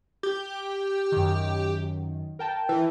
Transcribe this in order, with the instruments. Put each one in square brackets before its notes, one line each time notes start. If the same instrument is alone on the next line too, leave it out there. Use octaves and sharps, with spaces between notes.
[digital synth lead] G4
[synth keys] F#2 D#3
A#4 G5 A5
[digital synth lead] E3